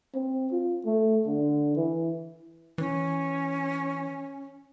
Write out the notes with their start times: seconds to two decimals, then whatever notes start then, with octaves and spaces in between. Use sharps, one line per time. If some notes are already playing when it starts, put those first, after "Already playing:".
0.14 C4
0.52 F4
0.86 A3
1.26 D3
1.76 E3
2.78 E3 C#4